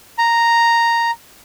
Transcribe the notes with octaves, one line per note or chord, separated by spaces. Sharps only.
A#5